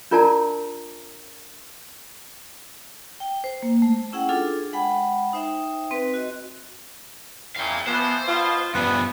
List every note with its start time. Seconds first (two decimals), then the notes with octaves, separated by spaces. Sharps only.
0.11 D4 F4 A#4 D5 A5 A#5
3.20 G5
3.44 C5
3.63 A#3
3.82 A3
4.13 C#4 E4 G#4 F#5 G5
4.29 D4 F4 G#4 A4
4.73 G#3 F#5 G5 B5
5.33 D#4 C5 E5 G5
5.91 C4 B4
6.14 F#4 D#5
7.56 A#2 C#3 E4 F5 G5
7.87 E3 F3 B3 C5
8.28 B2 F4
8.75 E2 G2 F3 B3